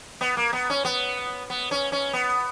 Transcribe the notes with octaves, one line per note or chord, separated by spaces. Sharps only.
B3
A#3
B3
C#4
B3
B3
C#4
C#4
B3